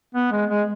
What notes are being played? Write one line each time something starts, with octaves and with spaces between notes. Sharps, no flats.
B3
G#3
G#3